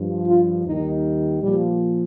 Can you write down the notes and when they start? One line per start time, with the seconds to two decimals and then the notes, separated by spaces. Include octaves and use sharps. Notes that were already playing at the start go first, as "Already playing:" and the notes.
Already playing: G2 F3
0.26 F4
0.65 D#2 D#3 G3 D#4
1.42 A#2 F3 G3